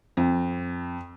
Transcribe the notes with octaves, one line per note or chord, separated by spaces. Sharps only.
F2